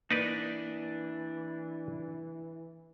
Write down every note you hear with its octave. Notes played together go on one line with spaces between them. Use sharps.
E3 A#3 D4 D#4 B4 D5